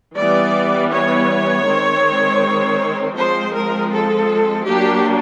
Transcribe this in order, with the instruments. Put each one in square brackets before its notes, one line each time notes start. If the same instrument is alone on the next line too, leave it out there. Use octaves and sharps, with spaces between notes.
[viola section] E3 G3 B3 D5
C#5
D#3 G#3 C4
F3 G#3 C4 C5
A#4
A4
F#3 A#3 D4 G4